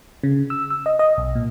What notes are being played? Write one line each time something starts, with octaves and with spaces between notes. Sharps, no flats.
C#3
E6
E6
D#5
D#5
B1
A#2